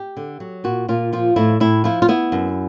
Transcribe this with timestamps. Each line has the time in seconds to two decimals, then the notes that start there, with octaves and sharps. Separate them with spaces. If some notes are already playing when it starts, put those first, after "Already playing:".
Already playing: G4
0.17 D3
0.40 F#3
0.64 A#2 F#4
0.89 A#2 F4
1.13 F3 F4
1.36 A2 E4
1.60 A2 E4
1.84 F3 E4
2.02 F4
2.09 B3 E4
2.32 F#2